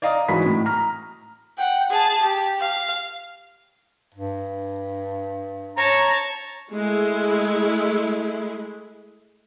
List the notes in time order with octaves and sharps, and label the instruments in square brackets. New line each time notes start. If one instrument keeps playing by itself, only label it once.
[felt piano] D5 D#5 F5 A#5 D#6
G#2 E3 F#3 F#4 B5 B6
A2
A#5 F6
[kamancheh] F#5 G5
G#4 A5
G4
F5
[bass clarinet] G2
[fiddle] C#5 A5 [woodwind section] A#5
[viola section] G#3 A3 E4